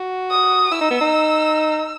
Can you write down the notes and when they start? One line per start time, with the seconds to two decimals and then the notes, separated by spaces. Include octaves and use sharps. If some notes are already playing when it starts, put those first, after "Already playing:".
Already playing: F#4
0.31 D#6
0.71 E4 E6
0.81 D#4
0.91 B3
1.01 D#4